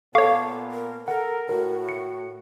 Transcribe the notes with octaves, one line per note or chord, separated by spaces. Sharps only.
A#2 B3 A4 C#5 F5 A5 C#6 D6
A#4
A4 A#4 F#5
A2 F#4 A#4
C#7